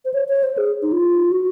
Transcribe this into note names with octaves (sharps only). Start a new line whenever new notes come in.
C5
C#5
C#5
C5
G#4
D#4
F4
F#4